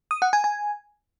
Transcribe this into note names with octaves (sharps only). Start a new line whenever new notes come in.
D#6
F#5
G#5
G#5